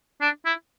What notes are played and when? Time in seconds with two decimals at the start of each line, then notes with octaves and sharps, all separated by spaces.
0.22 D4
0.46 E4